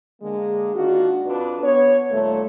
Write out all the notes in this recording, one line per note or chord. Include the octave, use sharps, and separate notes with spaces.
D3 G#3 A#3
D#3 D4 F4 F#4
F2 D4 B4
B3 C#5
D#2 A#2 G3 A3